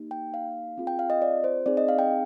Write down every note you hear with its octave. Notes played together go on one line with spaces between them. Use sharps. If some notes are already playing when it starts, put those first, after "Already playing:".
Already playing: A#3 D#4 G4
G5
F5
C4 F4 G#4
G5
F5
D#5
D5
C5
C4 D#4 G#4 D5
D#5
F5
G5